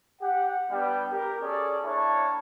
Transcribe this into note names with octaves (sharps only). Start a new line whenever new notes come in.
G4 F#5
G3 B3 D4 G5
G4 A#4
C#4 G#4 A4 D5
A#3 D4 E4 C#5 A5